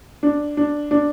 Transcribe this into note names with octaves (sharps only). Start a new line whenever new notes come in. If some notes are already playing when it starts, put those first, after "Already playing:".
D4
D4
D4